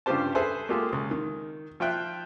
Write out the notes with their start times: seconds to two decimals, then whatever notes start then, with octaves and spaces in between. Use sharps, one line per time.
0.06 G2 C#3 F4 G4 C5 A5
0.35 G#4 A4 B4 C5 E5
0.69 G#3 A#3 F4 G4 A4
0.92 C#2
1.11 D#3
1.80 F3 F4 E5 G5 F#6